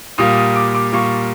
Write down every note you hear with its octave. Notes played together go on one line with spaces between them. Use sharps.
A#2 G3 A#3 D#6
D#6
D6
D6
A#2 G3 A#3 C#6